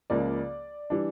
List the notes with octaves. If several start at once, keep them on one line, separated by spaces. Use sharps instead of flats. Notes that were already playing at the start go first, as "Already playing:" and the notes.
C#2 C#3 F3 A#3 D5
E3 G3 D4